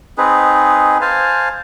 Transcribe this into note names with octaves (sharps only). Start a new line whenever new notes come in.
C4 D#4 G#4 B4
C5 F5 G#5 A5